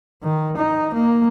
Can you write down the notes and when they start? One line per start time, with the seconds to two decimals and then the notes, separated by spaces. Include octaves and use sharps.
0.23 D#3
0.57 D#4
0.94 A#3